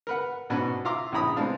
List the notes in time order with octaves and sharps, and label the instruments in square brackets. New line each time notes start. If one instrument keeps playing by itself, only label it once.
[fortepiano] A#4 B4 F#5
G#2 B2 C#4 D4 F#4 B4
F4 E5 F5 A#5 C6 D6
A#1 C#4 E4 A#5 B5 D#6
G#3 B3 C4 D4 F5